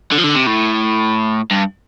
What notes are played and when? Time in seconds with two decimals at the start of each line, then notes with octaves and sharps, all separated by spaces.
0.12 D3
0.18 F3
0.24 D3
0.35 C3
0.46 A2
1.51 G2